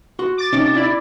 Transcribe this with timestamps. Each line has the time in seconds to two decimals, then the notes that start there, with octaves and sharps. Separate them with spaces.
0.19 F#4 F#5 C6
0.37 D6 A6
0.53 C3 C#4 D#4
0.75 E4 D5